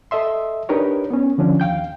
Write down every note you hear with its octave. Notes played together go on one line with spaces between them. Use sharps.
A4 D#5 E5 C6
D4 D#4 G4 A#4 B4 C#5
B3 C#4
D3 F3 C#4 D4
D#2 F5 G5 G6